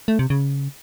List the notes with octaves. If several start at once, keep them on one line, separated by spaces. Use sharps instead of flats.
A3
C3
C#3